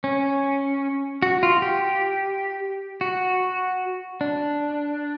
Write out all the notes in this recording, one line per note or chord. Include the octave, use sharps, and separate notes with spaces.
C#4
F#4
F4
G4
F#4
D4